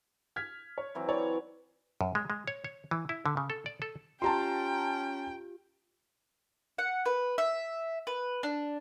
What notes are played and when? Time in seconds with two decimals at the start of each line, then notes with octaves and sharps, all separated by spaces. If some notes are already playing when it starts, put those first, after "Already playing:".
0.36 F6 G#6 B6
0.78 C#5
0.95 E3 F#3 C4
1.09 C#5 D5
2.01 F#2
2.15 G#3
2.30 G#3
2.48 C#5
2.64 C#5
2.91 E3
3.09 E4
3.26 D3
3.37 C#3
3.50 A4
3.66 D5
3.82 A4
4.22 C#4 F4 G4 G5 A5 A#5 C6
6.78 F#5
7.05 B4
7.38 E5
8.07 B4
8.43 D4